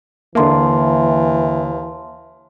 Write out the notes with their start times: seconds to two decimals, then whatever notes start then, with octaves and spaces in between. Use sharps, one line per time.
0.35 D#2 D3 E3 A#3 E5 A5 C6